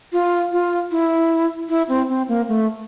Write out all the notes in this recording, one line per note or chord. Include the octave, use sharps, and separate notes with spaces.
F4
F4
E4
E4
C4
C4
A#3
A3